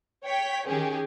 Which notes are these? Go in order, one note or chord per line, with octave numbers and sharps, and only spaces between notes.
C#5 G5 B6
D#3 C#4 G4 G#4